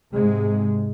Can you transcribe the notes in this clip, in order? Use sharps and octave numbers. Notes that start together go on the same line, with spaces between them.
G#2 C3 G#3